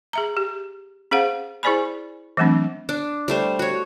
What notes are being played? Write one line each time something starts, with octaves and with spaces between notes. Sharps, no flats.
G#4 E5 A#5
G4
C#4 G#4 C5 F5 F#5
E4 G#4 C5 D5 G#5 B5
E3 F#3 A3 C4 D4
D4
G3 A3 C5
F#4 C#5